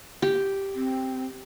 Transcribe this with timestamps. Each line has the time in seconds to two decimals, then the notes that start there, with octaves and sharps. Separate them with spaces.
0.22 G4
0.75 C4